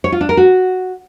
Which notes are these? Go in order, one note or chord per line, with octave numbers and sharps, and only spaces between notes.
C#5
F4
D4
A#4
F#4